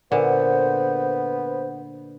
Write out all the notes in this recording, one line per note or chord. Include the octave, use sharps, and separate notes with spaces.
A#2 D3 B3 C5